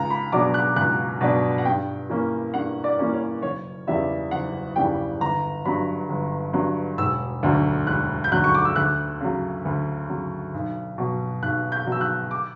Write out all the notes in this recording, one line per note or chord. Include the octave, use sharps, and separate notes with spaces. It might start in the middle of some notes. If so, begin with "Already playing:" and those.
Already playing: C#2 A#5
B5
B2 F#3 B3 D4 D6
F#6
C#2 F#6
B2 F#3 B3 D4
F#5
G2 G5
E3 A#3 C#4
G2 F#5
D5
E3 A#3 C#4
C#5
F#1 C#5
E2 C#3 E3 G3 E5
F#1 F#5
E2 C#3 E3 G3 G5
G1 A#5
G2 F#3 B5
G1
G2 F#3
E1 E6
D2 D3 F#3
E1 F#6
G6
D2 D3 F#3 F#6
C#6
D6
E6
D2 F#6
C#3 F#3
D2
C#3 F#3
B1
B2 F#3
B1 F#6
G6
B2 F#3
E6
F#6
D6